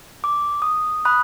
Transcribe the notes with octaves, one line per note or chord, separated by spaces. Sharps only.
D6
D#6
B5 D#6 F#6